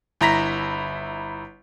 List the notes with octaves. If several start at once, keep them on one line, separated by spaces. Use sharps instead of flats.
G1 E4 A#5 A#6 B6